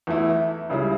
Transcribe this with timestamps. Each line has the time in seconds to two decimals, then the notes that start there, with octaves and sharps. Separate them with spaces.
0.07 E2 E3 A3 E4
0.69 C#2 C#3 G3 C#4 E4